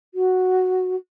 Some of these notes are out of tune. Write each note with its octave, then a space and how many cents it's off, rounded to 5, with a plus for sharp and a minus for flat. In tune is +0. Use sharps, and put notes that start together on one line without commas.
F#4 +0